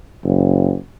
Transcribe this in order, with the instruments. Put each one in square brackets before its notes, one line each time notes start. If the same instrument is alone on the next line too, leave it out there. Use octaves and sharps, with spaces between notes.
[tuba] F#1